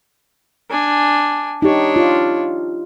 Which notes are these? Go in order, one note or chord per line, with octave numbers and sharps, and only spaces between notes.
D4 G#5
D4 D#4 G4 C#5
F4